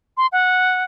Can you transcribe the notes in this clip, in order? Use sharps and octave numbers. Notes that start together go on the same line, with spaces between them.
C6
F#5